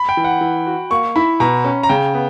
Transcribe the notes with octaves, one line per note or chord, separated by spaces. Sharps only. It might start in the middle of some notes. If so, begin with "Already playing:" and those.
Already playing: B5
G5
E3
F#5
E3
F#4
A#3 C#6
E4 B5
B2 A#5
C#4
A#5
C#3 G5
B3